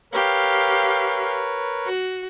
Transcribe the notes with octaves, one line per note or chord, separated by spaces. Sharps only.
G4 A#4 B4 C#5 F5
F#4